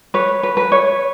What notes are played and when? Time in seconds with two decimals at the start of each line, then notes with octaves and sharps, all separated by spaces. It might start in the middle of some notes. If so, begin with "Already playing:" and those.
0.14 B4 C#5
0.43 B4
0.57 B4
0.72 C#5